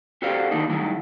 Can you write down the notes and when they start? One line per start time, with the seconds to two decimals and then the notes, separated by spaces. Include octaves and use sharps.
0.22 F#4 G4 A4 C5 D5 F5
0.51 D#3 A#3 D4 D#4
0.69 D#3 F#3 G3 A3 D#4 E4